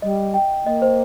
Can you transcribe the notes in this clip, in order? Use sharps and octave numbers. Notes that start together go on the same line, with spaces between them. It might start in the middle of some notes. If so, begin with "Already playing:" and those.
G3 D#5
G5
A#3 D#5
C5